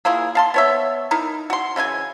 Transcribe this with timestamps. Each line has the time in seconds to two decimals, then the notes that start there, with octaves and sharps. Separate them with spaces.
0.05 A#3 E4 F4 G#4
0.35 F5 A5 C6
0.54 B3 C#5 E5
1.11 D#4 E4 A#4
1.50 F#4 C6
1.76 C#3 E3 E4 G#5